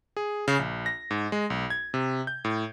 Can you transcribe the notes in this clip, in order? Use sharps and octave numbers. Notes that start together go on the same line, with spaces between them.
G#4
C#3
A#1
A#6
G#2
G#3
B1
G#6
C3
G6
A2